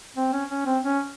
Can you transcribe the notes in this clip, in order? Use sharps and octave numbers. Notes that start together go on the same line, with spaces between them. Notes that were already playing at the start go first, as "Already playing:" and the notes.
C4
C#4
C#4
C4
C#4